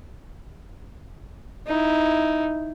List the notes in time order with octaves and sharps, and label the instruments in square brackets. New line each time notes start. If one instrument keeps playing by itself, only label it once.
[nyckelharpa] D#4 E4